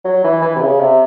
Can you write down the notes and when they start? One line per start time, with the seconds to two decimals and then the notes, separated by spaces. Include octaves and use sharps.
0.04 F#3
0.24 E3
0.42 E3
0.56 C3
0.61 C#3
0.80 C3